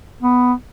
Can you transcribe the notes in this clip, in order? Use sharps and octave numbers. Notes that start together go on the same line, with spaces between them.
B3